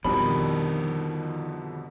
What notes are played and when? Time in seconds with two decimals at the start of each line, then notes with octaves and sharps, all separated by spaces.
0.05 F2 B2 D3 D#3 G3 A#4 B5